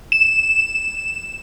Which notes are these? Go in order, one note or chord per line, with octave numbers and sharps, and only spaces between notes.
E7